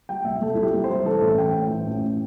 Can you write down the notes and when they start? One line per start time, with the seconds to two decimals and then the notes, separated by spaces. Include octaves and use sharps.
0.09 G3 G5
0.25 C2 E5
0.42 C2 A4
0.55 C2 E4
0.63 G4
0.74 C2
0.84 C5
0.89 G3
1.06 E3 A4
1.21 A1
1.38 E3 G5
1.54 A2
1.70 E3
1.86 A1
2.02 A2